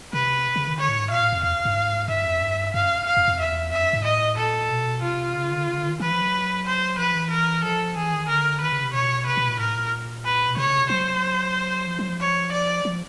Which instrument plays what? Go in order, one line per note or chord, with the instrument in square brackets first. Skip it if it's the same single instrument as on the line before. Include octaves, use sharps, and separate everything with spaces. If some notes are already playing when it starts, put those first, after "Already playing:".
[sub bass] C3 [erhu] B4
[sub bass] C#3
D#3
[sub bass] D3 [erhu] C#5
[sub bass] A2
G#2
[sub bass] A#2 [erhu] F5
[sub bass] A2
F2
[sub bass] E2 [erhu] F5
[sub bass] G2
G#2
[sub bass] G2 [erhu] E5
[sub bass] F2
G2
[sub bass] G2 [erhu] F5
[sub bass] F#2
[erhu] F5
[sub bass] F2
F2
[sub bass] E2 [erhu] E5
[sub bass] F2 [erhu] E5
[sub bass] F#2
G#2
[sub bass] A2 [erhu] D#5
[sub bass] A#2 [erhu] A4
[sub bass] B2
[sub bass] C3 [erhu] F4
[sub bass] C#3
D3
C#3
D3
D#3
[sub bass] E3 [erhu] B4
[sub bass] F3
F#3
[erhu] C5
[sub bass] F3 [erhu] B4
[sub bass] E3
[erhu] A#4
[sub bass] F3 [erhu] A4
[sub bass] E3 [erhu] G#4
[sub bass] D#3
[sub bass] D3 [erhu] A#4
[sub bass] D#3 [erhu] B4
[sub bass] C#3
C3
[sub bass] B2 [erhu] C#5
[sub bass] C3 [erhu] B4
[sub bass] B2
A#2
[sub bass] A2 [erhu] A#4
[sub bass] A#2
[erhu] B4
[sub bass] B2
[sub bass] C3 [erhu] C#5
[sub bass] C#3
C3
[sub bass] F#3 [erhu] C5
[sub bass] F3
F#3
F3
[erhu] C#5
D5
[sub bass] F3